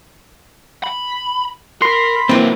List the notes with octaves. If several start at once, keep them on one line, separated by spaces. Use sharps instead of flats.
B5
A#4 B5 C6
C3 E3 F#3 A#3 C4